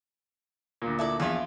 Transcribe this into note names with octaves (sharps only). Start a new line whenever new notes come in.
D2 A#2
E4 A4 D5
A#1 E2 E4 F4